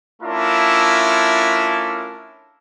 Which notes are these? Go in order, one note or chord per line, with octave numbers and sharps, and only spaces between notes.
A3 C#4 D4 E4 F4 A#4